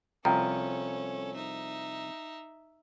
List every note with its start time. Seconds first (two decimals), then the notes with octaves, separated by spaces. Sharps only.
0.25 C2 F3 C#4 A4 G5 A#5
1.35 D#4 E5